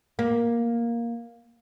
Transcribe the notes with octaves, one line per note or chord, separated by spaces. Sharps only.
A#3